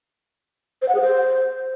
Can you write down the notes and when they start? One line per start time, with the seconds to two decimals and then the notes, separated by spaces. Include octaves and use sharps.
0.82 C5
0.88 F#5
0.95 G#4
1.01 C5